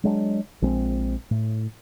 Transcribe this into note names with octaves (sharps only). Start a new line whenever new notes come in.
F#3 G#3 D4
A#1 G#3 C4
A2